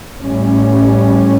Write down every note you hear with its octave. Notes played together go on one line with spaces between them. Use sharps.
A1 A2 G3 C#4